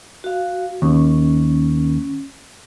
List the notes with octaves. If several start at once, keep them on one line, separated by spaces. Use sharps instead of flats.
F#4 F5
D#2 C#4